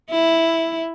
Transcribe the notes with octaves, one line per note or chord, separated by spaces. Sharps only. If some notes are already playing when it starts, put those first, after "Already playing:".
E4